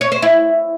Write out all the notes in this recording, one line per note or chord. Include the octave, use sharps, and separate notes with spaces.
C#5
C5
E4